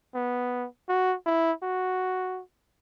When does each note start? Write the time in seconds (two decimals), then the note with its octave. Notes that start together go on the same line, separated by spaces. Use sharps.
0.14 B3
0.89 F#4
1.26 E4
1.63 F#4